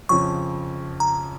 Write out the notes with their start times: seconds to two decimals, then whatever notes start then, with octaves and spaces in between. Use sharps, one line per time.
0.09 F2 C#3 F3 C#6
1.00 A#5